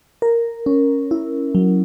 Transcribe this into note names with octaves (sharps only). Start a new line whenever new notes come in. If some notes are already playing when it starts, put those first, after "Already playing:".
A#4
C#4
E4
F#3